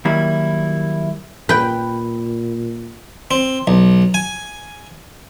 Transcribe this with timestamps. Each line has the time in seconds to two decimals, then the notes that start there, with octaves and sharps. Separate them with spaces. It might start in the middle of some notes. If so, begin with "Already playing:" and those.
0.05 D#3 F#3 G3 A#3 E4
1.49 A#2 B4 G5
3.31 C4
3.67 B1
4.14 G#5